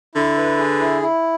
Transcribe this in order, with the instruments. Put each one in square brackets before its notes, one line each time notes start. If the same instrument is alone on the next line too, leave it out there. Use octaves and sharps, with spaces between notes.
[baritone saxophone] D3 [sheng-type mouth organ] E4
[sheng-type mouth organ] B4
G#4
E4
E4